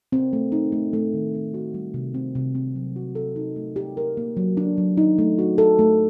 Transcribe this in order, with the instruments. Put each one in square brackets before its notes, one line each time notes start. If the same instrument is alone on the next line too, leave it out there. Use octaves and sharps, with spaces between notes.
[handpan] C4
A3
D#4
A3
A3
D#3
C4
F#4
G3
C3
C4
C3
C4
F#3
F#4
A4
D#4
A3
G4
A#4
A#3
F#3
D4
F#3
D#4
A3
F#4
A4
A3